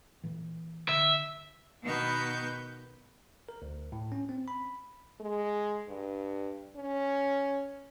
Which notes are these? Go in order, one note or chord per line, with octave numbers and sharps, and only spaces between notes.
A#2 E3
D3 E5
B2 D#3 B3 B4 C#6 G6
A#4
D2
A2
C#4
C4
B5
G#3
G2
C#4